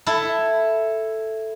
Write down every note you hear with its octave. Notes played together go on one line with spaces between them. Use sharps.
E4 A4